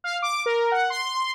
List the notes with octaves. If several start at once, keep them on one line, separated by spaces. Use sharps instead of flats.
F5
D6
A#4
F#5
C6